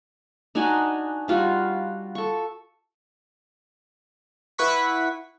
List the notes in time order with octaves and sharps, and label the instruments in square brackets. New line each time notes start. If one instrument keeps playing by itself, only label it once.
[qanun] D4 D#4 F#4 G#5
G3 F4 F#4
A4 C#6
[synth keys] E4 B4 F#5 C#6 B6